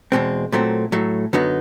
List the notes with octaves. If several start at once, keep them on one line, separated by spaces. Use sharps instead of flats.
E2 B2 G#3 C4
A#2 F#3 A3 C4
A2 F#3 A3
F#2 D3 F#3 B3 D#4